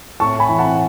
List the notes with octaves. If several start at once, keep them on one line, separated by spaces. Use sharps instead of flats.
A2 A5 C#6
G#5 B5
E3
F#5 A5